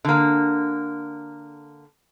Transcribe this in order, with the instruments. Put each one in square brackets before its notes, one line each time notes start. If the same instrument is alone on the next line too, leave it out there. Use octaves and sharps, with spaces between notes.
[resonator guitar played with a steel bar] D3 A#3